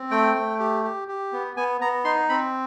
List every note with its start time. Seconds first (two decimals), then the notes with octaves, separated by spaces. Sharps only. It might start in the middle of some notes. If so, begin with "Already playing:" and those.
Already playing: C4
0.11 A3 G5
0.35 A3
0.59 G4
0.84 G4
1.08 G4
1.32 B3
1.57 B3 G#5
1.81 B3 A#5
2.05 D#4 C6
2.29 C4 B5